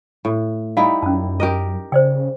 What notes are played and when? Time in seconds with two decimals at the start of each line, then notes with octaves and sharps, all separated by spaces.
0.25 A2
0.77 G3 D#4 E4 F5
1.03 F#2 C#4 A5
1.40 G4 A#4 D#5
1.92 C#3 C5 D5 G5